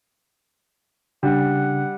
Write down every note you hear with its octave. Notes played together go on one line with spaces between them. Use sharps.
C#3 G3 D4 F#5